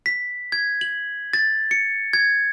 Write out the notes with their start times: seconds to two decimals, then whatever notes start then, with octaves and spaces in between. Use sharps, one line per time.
0.06 B6
0.52 G#6
0.81 F#7
1.33 A6
1.71 C#7
2.13 G#6